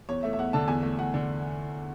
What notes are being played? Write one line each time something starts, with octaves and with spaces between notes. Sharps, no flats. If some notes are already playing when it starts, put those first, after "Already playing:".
E2 C#5
A3 E5
E5
E2 F#5
D3 A5
E2 G#5
A3
E2 F#5
D3